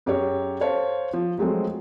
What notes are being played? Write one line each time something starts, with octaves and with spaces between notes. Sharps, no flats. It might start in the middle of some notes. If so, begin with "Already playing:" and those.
F#2 G4 G#4 C#5
A4 C5 C#5 F5 A5
F3
F3 F#3 G#3 A3 C4